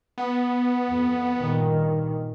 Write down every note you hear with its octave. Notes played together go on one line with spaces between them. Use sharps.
B3
F2
G2 A#2 D#3